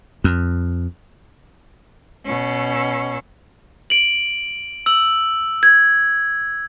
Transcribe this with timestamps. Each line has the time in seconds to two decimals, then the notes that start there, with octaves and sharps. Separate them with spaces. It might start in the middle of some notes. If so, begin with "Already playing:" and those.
0.24 F2
2.25 B2 C#4
3.90 D7 F#7
4.86 E6 F#7
5.63 G#6